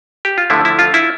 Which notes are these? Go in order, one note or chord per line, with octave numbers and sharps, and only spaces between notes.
G4
F4
D3 F3 A3 E4
E4
F4
E4